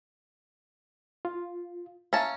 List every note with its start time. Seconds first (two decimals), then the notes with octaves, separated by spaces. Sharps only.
1.25 F4
2.13 C#4 E5 F5 A5 A#5